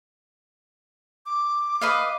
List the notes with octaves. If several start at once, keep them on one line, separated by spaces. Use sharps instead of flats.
D6
B4 D#5 F5